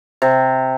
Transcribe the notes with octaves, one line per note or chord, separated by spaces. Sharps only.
C3